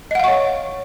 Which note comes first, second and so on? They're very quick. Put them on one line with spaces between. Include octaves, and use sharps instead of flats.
D#5 F#5 F5 C#6 C#5